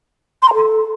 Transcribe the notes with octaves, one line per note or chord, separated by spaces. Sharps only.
C6
A#5
A4